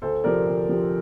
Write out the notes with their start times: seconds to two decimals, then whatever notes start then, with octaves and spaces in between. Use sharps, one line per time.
0.02 D2 A4 C5
0.24 C3 F3 A#4 D5
0.47 D2
0.69 C3 F3